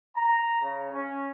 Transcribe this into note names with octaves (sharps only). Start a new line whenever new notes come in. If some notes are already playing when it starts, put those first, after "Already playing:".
A#5
C#3
C#4